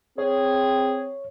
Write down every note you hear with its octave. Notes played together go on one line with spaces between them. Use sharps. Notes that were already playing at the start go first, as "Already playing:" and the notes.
C4 G#4 C#5